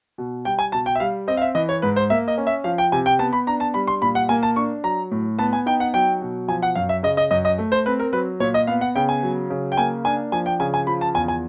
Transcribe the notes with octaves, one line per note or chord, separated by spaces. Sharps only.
B2
G3 G5
G#5
B2 A5
G5
E5
G3 F5
C4 D#5
F5
E5
E3 D#5
C#5
G#2 B4
C5
A#3 E5
D#5
C#4
E5
F3 F5
G5
C3 G#5
G5
B3 A5
B5
D4 A#5
A5
G3 B5
C6
A#2 B5
F#5
A#3 G#5
A5
D4 C#6
F#3 A#5
A2
B3 A5
G#5
D#4 G5
F#5
F#3 G5
B2
F3 G#5
F#5
F#2 F5
E5
C#3 D#5
D#5
F#2 D#5
D#5
A3
C5
C4 B4
A#4
F#3 B4
A#2 C#5
D#5
B3 F5
F#5
C#3 G5
G#5
F#3
C#3
G5
A#3 G#5
D4 G#5
F3 G#5
G5
C#3 G#5
G#5
F3 B5
A5
E2 G#5
G#5